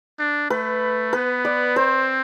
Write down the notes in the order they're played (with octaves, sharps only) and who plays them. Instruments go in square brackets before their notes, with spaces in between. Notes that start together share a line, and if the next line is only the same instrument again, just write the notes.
[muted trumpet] D4
[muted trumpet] A3 [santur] B4
[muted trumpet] B3 [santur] B4
[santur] D5
[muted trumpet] C4 [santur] C5